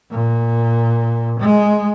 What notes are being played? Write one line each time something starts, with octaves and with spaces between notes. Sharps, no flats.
A#2
G#3